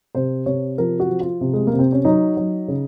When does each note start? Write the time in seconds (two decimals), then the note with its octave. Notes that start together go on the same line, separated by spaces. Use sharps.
0.15 C3 C5
0.46 C3 C#5
0.78 F3 A#4
1.00 F#4
1.09 F3
1.20 F4
1.41 C3
1.54 G#3
1.67 A#3
1.73 C3
1.79 C4
1.92 C#4
2.05 F#3 D#4
2.37 F#3
2.68 C#3